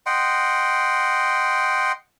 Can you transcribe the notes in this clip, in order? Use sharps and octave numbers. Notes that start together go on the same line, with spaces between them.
D#5 F#5 G5 C6